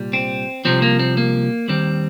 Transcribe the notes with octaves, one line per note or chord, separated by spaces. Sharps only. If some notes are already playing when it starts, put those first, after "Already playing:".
Already playing: C2 A#2 G3
C4
C2 C3 F3 C4
A#3
C4
A#3
D#2 D#3 G3 C4